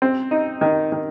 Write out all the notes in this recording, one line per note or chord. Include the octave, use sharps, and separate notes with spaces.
C4
D#4
D#3
D#3